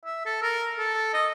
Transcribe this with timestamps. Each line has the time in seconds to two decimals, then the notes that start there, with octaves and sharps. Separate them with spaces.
0.05 E5
0.26 A4
0.42 A#4
0.78 A4
1.14 D#5